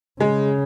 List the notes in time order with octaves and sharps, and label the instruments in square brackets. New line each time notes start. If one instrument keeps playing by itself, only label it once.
[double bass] C#3 [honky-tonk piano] G#3